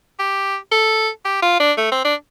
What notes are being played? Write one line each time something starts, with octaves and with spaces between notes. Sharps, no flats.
G4
A4
G4
F4
D4
A3
C4
D4